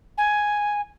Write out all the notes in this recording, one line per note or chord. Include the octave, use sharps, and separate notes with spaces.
G#5